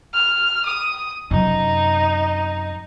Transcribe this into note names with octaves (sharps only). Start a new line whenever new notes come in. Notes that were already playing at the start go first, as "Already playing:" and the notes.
F6
D#6
F#2 C3 D#4